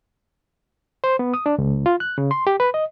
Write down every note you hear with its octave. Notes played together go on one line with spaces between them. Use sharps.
C5
B3
D#6
D4
C#2
F4
F#6
C#3
C6
G4
B4
D#5